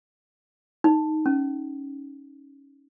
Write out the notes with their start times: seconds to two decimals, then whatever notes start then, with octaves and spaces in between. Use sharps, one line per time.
0.84 D#4
1.26 C#4